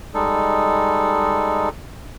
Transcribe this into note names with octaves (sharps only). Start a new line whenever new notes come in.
G3 G#3 D#4 A4